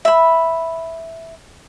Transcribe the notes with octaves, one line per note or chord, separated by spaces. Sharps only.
E5 B5